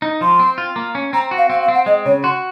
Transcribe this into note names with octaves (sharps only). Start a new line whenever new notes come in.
D#4
F3 C6
C4
F4
A#3
C#4
C4 A#5
F#4
F5
C4 F5
F5
C4
F#5
G#3 D#5
C#3 C#5
F#4 C6